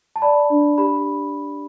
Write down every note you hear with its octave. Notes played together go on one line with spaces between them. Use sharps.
A5
D5 B5
D4
G4 B5